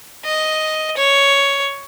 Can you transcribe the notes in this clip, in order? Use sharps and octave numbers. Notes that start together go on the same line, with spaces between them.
D#5
C#5